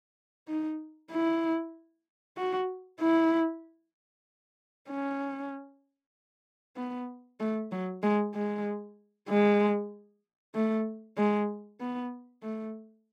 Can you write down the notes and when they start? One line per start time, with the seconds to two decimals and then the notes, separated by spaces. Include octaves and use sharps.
0.48 D#4
1.11 E4
2.37 F#4
3.00 E4
4.89 C#4
6.76 B3
7.40 A3
7.72 F#3
8.03 G#3
8.34 G#3
9.29 G#3
10.55 A3
11.17 G#3
11.80 B3
12.43 A3